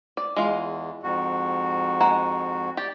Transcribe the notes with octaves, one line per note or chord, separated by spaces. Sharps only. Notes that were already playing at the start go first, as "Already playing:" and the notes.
D5
E2 G#3 F4
F2 G#2 F#4
G#3 F#5 A#5
G4 D5